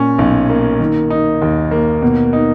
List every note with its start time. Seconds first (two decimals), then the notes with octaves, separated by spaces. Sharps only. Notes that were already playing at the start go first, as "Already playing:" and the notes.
Already playing: A#2 C#4
0.19 B1
0.49 A#3
0.80 D#3
1.10 D#4
1.42 D#2
1.71 A#3
2.02 B2
2.33 D#4